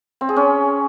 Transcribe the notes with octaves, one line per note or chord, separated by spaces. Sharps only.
C4
G#4
C#4